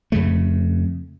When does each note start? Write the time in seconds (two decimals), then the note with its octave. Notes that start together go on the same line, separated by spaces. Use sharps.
0.12 F2 C#3 A3